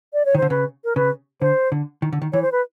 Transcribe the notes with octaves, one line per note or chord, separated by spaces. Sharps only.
D5
C#5
D#3
D3 C5
C#3 B4
A#4
C#3 B4
D3 C5
D3
D#3
D3
D#3
E3 C#5
C5
B4